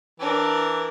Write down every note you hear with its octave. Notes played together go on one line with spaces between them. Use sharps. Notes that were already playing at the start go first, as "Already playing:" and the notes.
E3 D4 A#4